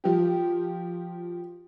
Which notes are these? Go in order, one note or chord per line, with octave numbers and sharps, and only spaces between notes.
F3 G4